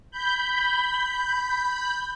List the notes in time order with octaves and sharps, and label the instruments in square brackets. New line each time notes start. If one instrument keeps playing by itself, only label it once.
[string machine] B5 G6